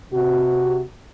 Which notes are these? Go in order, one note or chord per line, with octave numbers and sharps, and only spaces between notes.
C3 F#4